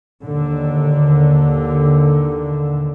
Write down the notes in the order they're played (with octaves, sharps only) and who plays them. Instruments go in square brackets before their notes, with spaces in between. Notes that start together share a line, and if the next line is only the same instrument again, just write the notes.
[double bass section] D#2 D3